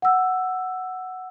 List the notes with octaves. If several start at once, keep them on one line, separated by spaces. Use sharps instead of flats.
F#5 E6